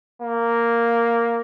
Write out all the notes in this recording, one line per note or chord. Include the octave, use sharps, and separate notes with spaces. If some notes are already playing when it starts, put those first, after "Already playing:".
A#3